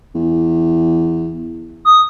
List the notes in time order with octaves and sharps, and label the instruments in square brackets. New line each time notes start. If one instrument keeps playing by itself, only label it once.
[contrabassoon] E2
[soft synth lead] D#6